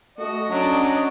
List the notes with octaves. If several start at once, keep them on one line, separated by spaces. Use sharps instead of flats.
A3 F#4 D#5
F#3 C#4 D4 D5